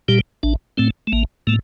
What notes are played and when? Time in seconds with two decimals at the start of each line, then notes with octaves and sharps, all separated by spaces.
0.08 A#2 G3 G4
0.43 A1 D4
0.77 A2 A3 C4
1.07 A3
1.12 A1 A#3
1.47 A2 A3 A#3